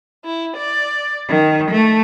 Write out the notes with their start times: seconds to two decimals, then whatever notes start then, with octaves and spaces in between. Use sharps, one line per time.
0.24 E4
0.57 D5
1.28 D#3
1.70 A3